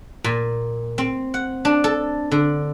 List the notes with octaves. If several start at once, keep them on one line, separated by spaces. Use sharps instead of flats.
A#2
C4
F#5
D4
A4
D3